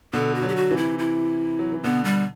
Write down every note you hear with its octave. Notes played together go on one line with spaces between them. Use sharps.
B2 D3 A4
F#4
D3 F#3
G4
F#4
C3 E3
E4
E4
F#3
E3
B2 D3 B3
G3